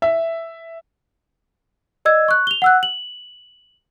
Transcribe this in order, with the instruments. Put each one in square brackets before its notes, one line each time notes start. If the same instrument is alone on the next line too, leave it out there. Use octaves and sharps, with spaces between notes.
[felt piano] E5
[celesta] D5 D#5 E6 G#6
C#6 F#6
F7 G7
F#5 E6 F#6
F#7